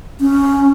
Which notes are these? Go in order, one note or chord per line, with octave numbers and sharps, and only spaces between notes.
C#4